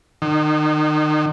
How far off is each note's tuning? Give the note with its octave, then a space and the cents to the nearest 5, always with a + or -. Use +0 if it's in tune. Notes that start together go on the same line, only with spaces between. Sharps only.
D#3 -35